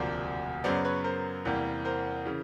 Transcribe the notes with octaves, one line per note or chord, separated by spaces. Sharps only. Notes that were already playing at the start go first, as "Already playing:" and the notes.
Already playing: E1 D2 C3 F3 A#3 C5 D5
F#2 C#3 F#3 B3 C5 D5
B4 C#5
A#4 C5
E2 C3 E3 G3 A#3
A#4 C5
C#3 E3